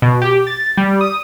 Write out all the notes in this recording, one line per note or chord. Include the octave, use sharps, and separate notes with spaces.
B2
G4
A6
G3
D#6